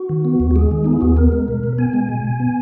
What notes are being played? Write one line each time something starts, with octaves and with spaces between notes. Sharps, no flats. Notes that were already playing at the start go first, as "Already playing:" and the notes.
Already playing: F#4
D#3
B3
D#2
F#4
G#3 G#4
D#3
B3 D#4
E4
D#2 F#4
G#4
B3 A#4
G#3
B2
B2
B3 G#5
G#3
B2
B2
B3